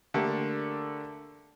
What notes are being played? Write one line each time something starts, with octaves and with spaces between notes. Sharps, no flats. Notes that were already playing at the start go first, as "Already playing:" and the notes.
D3 A3 A#3 G4